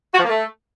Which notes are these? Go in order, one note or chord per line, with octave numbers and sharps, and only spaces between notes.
F#4
F3
A#3
A3